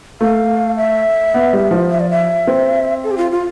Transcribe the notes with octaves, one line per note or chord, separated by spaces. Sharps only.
A3 F5
E5
B3
G3
F3
E5
D5
E5
C4
A4
G4
F4
F4